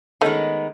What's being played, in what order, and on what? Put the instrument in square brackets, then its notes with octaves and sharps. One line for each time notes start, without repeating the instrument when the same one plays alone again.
[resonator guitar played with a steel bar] D#3 G#3 B3 D#4 [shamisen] A3 C#4